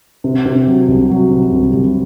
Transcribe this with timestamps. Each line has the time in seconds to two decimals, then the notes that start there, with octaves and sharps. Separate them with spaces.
0.24 C3
0.45 C3
0.67 F#3
0.88 C2
1.10 F#3
1.30 C3
1.52 C2
1.74 C2